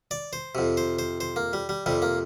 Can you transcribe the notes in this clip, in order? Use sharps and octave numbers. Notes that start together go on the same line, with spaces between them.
D5
C5
F2 C3
C5
C5
C5
A#3
G3
G3
F2 C3 G3
A#3